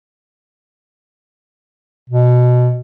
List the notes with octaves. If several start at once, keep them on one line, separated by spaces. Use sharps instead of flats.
B2